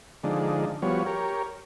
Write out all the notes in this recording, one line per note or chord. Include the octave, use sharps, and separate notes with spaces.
D3 F3 G#3 D4 D#4
F3 G3 B3 F#4 C#5
G4 A#4 C#5